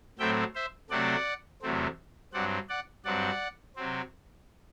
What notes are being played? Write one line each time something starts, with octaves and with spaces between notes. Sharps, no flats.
A2 F#3 A3 C4 E5 G5
C5 E5
C3 F#3 A3 C4 D5 F#5
E2 C3 F#3 A3 C4
G2 F#3 C4 D5 F#5
D5 F#5
G2 F#3 C4 D5 F#5
C3 F#3 C4